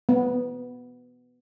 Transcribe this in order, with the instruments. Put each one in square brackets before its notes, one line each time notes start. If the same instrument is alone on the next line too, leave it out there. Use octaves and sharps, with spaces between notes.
[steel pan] B3